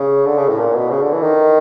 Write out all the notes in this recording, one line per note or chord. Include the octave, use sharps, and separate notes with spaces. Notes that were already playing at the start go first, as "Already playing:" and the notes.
Already playing: C#3
D3
C#3
A2
A#2
B2
C#3
D3
E3
D#3